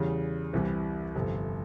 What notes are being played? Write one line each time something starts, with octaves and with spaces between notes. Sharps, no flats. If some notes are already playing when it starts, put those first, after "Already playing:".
Already playing: E2 C#3 G3
C2 C3 E3 G3
G1 F2 C3